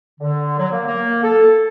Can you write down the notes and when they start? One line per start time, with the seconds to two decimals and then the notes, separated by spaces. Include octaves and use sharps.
0.20 D3
0.58 F#3
0.72 A#3
0.87 A#3
1.23 A4